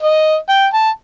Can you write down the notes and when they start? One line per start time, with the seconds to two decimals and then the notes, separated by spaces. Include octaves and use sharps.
0.03 D#5
0.50 G5
0.74 A5